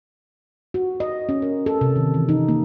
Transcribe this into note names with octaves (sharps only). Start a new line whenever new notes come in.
F#4
D#5
C#4
A#4
A4
C3
D#3
E3
D#4
A#3